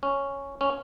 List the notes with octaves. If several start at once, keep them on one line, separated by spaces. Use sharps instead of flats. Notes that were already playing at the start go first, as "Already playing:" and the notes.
C#4
C#4